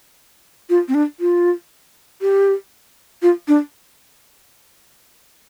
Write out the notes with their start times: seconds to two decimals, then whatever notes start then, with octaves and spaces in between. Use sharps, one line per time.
0.70 F4
0.88 C4
0.94 D4
1.20 F4
2.22 G4
3.23 F4
3.48 D4